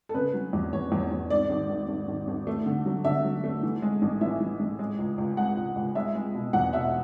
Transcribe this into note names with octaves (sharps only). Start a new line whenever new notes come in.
A4
C#3 B4
F#3
E2
E2 C#5
E2
E2
G#2 D5
G#1
G#1
G#1
G#1
G#1
A3
D3
F#3
D3 E5
F#3
A3
E3
G#3
A1
E3 E5
E3
A1
G#3
C#2
C#2
G#3 F#5
C#2
C#2
G#3 E5
G#3
B2
E2 F#5
B2 E5